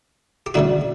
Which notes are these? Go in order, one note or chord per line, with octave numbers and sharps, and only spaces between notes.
G4
D2 C#3 G3 D4 F#4